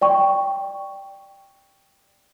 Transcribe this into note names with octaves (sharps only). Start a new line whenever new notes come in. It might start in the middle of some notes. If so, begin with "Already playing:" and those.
D5 G5 C#6